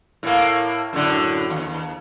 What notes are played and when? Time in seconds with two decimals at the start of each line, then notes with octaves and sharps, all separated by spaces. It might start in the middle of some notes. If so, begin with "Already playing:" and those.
0.23 A2 A#3
0.93 F#2 A2 D3
1.50 D#2